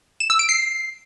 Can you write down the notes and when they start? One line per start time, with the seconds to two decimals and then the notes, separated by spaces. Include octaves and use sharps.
0.20 E7
0.30 E6
0.39 D7
0.49 C7